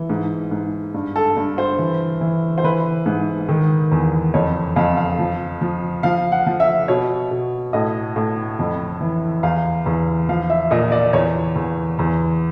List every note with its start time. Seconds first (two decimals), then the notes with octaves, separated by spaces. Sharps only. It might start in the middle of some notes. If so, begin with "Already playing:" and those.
Already playing: E3
0.10 G#2
0.51 G#2
0.94 G2
1.16 A4
1.37 G2
1.58 C5
1.78 E3
2.21 E3
2.58 C5
2.64 E3 B4
3.06 G#2
3.49 D#3
3.92 E2
4.34 F2 C#5
4.76 F2 F5
4.97 F5
5.19 F3
5.61 F3
6.03 F3 F5
6.32 F#5
6.47 F3
6.60 E5
6.88 B2 C#5
7.31 B2
7.73 A2 D#5
8.16 A2
8.59 F2
9.01 E3
9.43 E2 F5
9.86 E2
10.29 F3 F5
10.50 E5
10.71 A#2 D#5
10.92 D5
11.13 E2 C#5
11.56 E2
11.99 E2